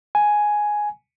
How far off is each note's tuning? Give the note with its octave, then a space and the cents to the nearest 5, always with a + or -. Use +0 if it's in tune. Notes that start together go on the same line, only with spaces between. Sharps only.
G#5 +5